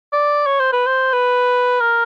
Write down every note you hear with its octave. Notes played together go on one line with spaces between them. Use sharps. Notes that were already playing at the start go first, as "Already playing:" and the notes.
D5
C#5
C5
B4
C5
B4
A#4